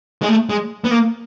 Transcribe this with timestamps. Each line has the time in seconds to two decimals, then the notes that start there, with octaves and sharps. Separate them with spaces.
0.22 G#3
0.29 A3
0.50 G#3
0.84 B3
0.91 A#3